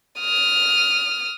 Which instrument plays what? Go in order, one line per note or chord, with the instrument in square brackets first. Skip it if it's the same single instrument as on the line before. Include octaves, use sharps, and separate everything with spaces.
[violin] D#6 F6